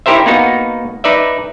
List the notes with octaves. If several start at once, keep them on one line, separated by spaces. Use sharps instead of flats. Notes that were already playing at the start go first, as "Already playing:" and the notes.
D#4 E4 G4 A#4 C5 E5
A#3 B3 D#4 F#4
D#4 B4 D5 E5